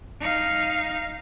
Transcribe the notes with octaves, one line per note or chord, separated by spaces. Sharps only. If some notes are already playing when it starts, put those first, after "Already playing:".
D#4 F5